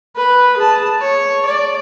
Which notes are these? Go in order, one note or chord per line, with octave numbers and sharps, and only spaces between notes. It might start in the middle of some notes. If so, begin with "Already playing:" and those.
B4
G#4 A5
C#5
D5